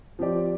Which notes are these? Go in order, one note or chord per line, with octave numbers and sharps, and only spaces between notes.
F3 C4 G4 D5